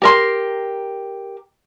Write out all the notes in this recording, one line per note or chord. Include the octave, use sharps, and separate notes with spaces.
G4 A#4 C6